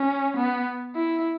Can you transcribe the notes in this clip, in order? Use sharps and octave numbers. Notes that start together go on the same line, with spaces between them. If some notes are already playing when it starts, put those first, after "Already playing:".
Already playing: C#4
B3
E4